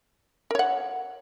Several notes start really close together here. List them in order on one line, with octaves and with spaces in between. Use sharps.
A#4 C#5 F#5